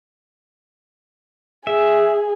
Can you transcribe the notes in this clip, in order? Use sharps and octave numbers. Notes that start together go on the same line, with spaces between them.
G#4 E5